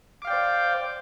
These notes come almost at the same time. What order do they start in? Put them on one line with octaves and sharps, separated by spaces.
D6 F5 G5 D5 C5